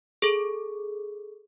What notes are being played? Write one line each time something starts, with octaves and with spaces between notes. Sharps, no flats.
G#4 A4